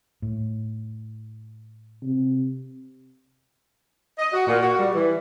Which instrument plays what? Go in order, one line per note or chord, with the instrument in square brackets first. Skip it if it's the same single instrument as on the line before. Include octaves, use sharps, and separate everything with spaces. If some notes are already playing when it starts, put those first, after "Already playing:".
[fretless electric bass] A2
[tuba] C3
[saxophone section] D#5
F#4
A#2
F#4
G3
E3